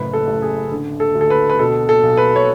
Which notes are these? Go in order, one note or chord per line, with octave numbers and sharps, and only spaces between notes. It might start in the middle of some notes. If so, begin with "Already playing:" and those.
Already playing: F#1 A2 B4
A4
A1
G#4
D3
A4
D2
A4
B4
B4
B2 A4
A4
B1
B4
C#5